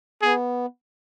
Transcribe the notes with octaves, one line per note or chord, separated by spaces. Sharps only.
B3 G#4